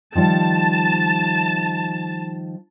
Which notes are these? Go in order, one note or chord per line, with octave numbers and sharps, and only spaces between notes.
D#3 F3 G3 A5